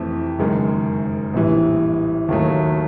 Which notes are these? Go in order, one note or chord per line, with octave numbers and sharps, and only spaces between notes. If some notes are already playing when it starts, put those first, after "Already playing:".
Already playing: F2 C3 E3 A3
F#1 F#2 D#3 G#3
A#1 A2 E3 G3
D#2 D#3 F#3 A3